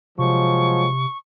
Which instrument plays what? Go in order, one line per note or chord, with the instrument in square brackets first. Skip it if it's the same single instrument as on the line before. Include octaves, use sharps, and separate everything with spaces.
[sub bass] C3 [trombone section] F3 F#3 G#3 [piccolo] C#6